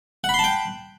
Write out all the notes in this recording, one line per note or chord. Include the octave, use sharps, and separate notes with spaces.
F#5 G5 A5 B5 C6